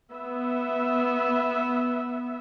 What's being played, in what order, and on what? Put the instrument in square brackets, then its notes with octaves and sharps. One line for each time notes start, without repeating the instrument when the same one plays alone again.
[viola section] B3 E5